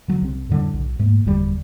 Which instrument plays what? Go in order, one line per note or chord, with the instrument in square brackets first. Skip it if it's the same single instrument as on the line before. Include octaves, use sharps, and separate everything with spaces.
[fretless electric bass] D3 F#3
C2 C4
F2 A2 D3 G3
B1
G#2 A3 A#3
F#1 E2 D3 G3